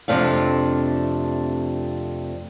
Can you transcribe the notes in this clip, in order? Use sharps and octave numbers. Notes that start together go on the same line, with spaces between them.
F2 C3 A3 D4 F5